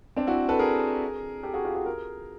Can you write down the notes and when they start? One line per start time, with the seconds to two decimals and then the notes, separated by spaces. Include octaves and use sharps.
0.16 C4 D4
0.27 E4 F#4
0.49 A4 B4
0.59 G#4 A#4
1.43 G4 A4
1.54 F#4 G#4
1.65 F4 G4
1.75 F#4 G#4
1.86 G#4 A#4